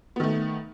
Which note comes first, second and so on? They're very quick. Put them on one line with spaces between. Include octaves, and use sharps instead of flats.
B3 D#3 A3